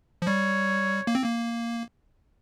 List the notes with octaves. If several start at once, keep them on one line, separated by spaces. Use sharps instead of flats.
F3
G3 C#5
A#3
C4
A#3